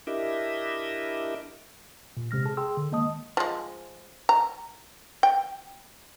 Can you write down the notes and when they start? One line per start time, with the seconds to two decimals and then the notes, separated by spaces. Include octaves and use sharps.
0.07 D4 E4 G4 A#4 D#5 E5
2.17 A#2
2.31 C3 G#3 F6 A#6
2.45 G#4 A5
2.57 G#4 G5 C6 E6
2.77 D3
2.91 D#3 G#3 A#3 D#5 A5 D#6
3.37 F3 G#3
4.29 A#5
5.23 G5